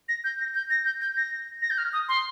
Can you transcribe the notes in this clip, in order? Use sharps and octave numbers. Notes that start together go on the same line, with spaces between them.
A#6
G6
A#6
G6
A#6
G6
G6
A#6
A#6
G6
F6
D#6
C6